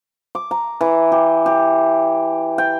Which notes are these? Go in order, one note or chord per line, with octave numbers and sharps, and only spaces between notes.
D6
A#5
E3
G4
G4
G5